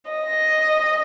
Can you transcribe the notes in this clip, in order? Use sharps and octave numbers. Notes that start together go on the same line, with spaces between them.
D#5